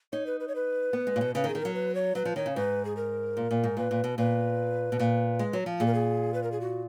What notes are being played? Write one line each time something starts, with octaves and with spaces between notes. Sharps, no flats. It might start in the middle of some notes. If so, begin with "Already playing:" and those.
D#4 C#5
B4
B4
C#5
B4
B3
G#3
A#2
B2
C#3 B4
D#3
G#4
D#3
F#3 A#4
B4
C#5
F#3 B4
F3
D#3 C#5
C#3
G#2 B4
G#4
A#4
A#2
A#2
G#2
A#2 B4
A#2
B2
A#2 B4
B2
A#2
G#3
F#3
F3
A#2 G#4
A#4
G#4
B4
A#4
G#4
F#4